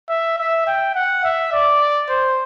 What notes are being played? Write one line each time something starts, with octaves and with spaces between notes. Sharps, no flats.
E5
E5
G5
F#5
E5
D5
C5